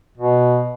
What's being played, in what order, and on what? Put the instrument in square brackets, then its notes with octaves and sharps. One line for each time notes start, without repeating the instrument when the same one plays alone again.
[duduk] B2